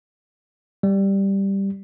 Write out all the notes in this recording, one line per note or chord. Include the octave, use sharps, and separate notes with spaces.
G3